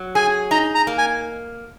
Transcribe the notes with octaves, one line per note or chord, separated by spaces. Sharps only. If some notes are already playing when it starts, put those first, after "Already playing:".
Already playing: F#3
G#4 G#5
D#4 A#5
A#5
A#3
G#5